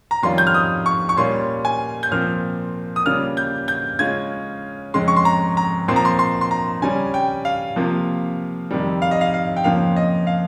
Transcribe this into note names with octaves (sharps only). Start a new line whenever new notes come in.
A#5
F2 D#3 G3 C#4 F4 C6
G6
F6
D#6
C#6
C#6
A#2 G3 C#4 F4 C6
G#5
G6
A#2 F3 C4 F6
D#6
C#3 G3 A#3 F4 F6
G6
G6
C#3 G#3 C#4 F4 G#6
F2 C#3 G#3 C6
C#6
C6
A#5
A#5
A#2 F3 C4 F4 C6
A#5
C6
C6
C6
A#5
C#3 G3 C#4 G#5
G5
F5
C3 F3 A#3 F4
F2 C3 D#3 G3
F5
D#5
F5
F5
G5
F2 C#3 F3 A#3 F5
D#5
F5